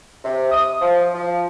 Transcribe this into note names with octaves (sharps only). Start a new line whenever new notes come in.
C3
D#6
F3
F3